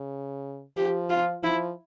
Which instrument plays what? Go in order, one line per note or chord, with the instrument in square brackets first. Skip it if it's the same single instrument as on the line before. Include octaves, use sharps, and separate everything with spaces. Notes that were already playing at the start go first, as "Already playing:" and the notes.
Already playing: [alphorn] C#3
[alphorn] F3 [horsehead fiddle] G4
[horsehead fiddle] F4
[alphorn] F3 [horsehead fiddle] E4